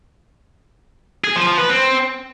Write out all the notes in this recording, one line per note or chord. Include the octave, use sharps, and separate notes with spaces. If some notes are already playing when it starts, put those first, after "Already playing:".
G#4
F3
F3
B4
C4